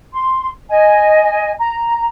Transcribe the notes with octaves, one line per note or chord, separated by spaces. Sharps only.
C6
D#5 G#5
A#5